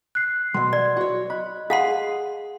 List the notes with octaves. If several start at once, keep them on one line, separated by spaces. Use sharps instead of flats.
F#6 C7
B2 F#3 C6
D5
F#4 C#5
D#5 B5 F#6
G#4 F5 F#5 C6